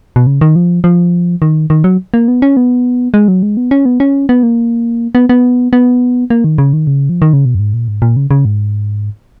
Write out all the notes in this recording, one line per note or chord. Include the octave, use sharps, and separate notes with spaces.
B2
C#3
D#3
F3
F3
D#3
D#3
F#3
A#3
B3
C#4
B3
G#3
F#3
G#3
B3
C#4
B3
C#4
B3
A#3
B3
B3
B3
A#3
D#3
C#3
D#3
C#3
F3
D#3
C#3
B2
F#2
G#2
A#2
G#2
A#2
C#3
C#3
G#2